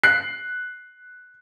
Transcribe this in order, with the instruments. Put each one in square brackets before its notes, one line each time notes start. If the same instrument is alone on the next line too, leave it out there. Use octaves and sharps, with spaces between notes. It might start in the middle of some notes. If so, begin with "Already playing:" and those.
[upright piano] F#6 C7